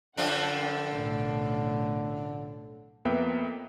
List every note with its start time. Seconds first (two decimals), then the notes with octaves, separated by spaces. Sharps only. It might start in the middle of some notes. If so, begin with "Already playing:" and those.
0.17 F#2 D3 F3 D4 F#5 G5
0.91 B1 A2
3.05 F2 A#3 B3 B4 E5 G5